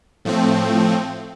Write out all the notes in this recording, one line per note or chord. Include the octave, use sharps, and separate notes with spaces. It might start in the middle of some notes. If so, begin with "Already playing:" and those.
A2 F3 A3 C4